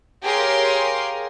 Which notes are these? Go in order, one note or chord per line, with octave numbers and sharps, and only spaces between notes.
G4 G#4 A#4 C#5 F5 C6